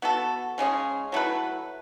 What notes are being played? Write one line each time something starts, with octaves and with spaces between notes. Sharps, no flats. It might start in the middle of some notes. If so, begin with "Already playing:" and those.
B3 F#4 A4
C#3 G#3 C#4 G#4
F#3 A3 E4 B4